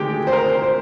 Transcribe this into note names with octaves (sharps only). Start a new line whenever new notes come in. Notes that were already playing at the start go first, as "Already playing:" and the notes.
Already playing: D2 C3 D#3 G#3 G4
C5
A#4
C5
C5